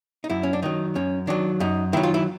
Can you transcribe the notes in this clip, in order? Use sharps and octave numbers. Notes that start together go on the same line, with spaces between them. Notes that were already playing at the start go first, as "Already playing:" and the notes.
D#4
F#2 E4
C#4
D4
D#3 F#3 D#4
F#2 C#4
D#3 F#3 D4
F#2 D#4
D#3 F#3 E4
F4
E4